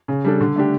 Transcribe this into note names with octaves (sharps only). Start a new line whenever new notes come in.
C#3
G3 D4 A4
D3
A3 D4 G4